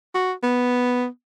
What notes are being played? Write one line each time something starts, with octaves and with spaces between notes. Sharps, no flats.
F#4
B3